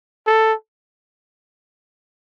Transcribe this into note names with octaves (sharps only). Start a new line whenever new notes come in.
A4